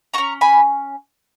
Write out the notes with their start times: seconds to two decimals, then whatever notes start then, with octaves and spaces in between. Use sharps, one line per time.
0.14 F#4 A#5 C#6
0.18 C#4
0.41 G#5 B5